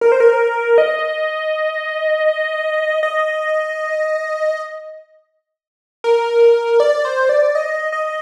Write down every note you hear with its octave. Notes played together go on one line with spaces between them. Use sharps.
A#4
C5
A#4
D#5
D#5
A#4
D5
C5
D5
D#5
D#5